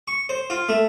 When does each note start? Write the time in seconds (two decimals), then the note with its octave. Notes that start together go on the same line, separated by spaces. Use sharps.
0.08 C#6
0.29 C5
0.50 F4
0.69 A3